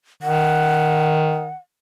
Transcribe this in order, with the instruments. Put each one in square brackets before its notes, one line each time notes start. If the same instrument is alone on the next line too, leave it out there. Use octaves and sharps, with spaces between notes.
[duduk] D#3 [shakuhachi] F#5